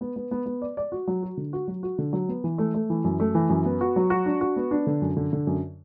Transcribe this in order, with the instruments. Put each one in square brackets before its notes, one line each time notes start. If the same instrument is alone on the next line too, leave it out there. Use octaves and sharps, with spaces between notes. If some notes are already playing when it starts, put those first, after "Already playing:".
[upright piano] B3
B3
B3
B3
D5
D5
F#4
F#3
F#4
D3
F#4
F#3
F#4
D3
F#3
B3
E3
A3
A3
E3
F#2
A3
E3
F#2
B3
F#4
F#3
F#4
D4
F#4
B3
D4
D3
F#2
D3
D3
F#2